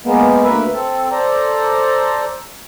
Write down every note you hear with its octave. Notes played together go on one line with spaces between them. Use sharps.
G#3 A#3 B3
D2 A#3 A#4 B4 E5
C4 A4
A4 C5 D5 A#5